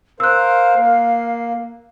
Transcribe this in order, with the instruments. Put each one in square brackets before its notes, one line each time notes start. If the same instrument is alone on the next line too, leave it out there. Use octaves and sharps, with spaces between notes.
[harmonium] A#4 C5 [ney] F5 [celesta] E6 F#6
[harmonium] A#3